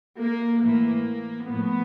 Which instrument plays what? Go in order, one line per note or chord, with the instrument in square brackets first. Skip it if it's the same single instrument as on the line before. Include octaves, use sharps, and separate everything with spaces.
[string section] A#3
A2 E3 A#3
A2 F3 B3